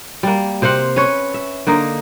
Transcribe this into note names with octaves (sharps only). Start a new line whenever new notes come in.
G3 A#3
C3 C5 F5 F#5
C#4 B4 C#5
E5
D3 A#3 D#4